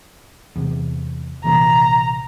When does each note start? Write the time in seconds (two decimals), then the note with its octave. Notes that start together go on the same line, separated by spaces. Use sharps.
0.56 E2 C3
1.44 A#1 C3 E3 A#5